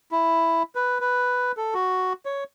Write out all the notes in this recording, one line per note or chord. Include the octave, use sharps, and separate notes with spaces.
E4
B4
B4
A4
F#4
C#5